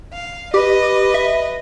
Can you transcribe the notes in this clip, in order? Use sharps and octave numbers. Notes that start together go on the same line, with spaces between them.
F5
G4 B4 D#5
E5